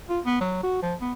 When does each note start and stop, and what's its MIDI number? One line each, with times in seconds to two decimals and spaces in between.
0.09 0.20 65
0.26 0.37 59
0.41 0.60 54
0.63 0.81 66
0.83 0.95 53
1.01 1.13 59